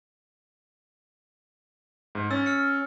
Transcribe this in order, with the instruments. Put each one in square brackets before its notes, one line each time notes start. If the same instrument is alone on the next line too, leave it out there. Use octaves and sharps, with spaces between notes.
[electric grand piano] G#2
[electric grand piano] C#4 A6 [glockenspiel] E6
[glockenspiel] F6 C#7